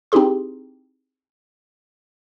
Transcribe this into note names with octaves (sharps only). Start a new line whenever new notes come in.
C4 D#4 E4 G4 G#4 C6